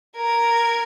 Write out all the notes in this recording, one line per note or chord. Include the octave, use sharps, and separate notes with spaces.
A#4 G#6